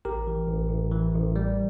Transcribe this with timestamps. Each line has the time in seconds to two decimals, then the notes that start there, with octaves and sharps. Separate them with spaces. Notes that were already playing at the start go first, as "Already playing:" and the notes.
0.05 A1 G4 A#4
0.27 E3
0.48 A1
0.70 A1
0.92 E3
1.14 A1
1.36 G3